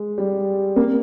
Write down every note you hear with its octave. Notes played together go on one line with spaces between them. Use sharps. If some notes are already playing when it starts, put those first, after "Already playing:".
Already playing: G#3
G3
A#3